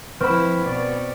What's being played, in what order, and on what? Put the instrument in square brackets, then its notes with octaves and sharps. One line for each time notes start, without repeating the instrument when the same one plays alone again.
[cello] F3 E4 [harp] C4 B5 [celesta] B4 C#6 F6
[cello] B2 D5